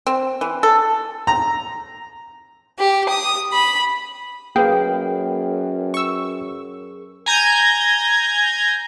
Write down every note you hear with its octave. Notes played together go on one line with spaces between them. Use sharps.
C4
E3
A4
A#5
G4
D#6
B5
F#2 A#3 G#4 A#4 B4 G5
C#6 E6
G#5 A#5 G6 G#6